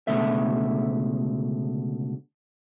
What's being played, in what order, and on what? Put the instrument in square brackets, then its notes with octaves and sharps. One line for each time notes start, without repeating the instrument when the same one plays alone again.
[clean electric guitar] C#2 B2 D3 A3 E5